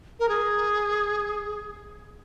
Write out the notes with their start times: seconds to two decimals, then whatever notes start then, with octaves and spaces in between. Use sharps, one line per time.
0.20 A#4
0.29 G#4